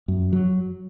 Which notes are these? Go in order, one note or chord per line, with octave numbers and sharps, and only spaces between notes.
F#2
F#3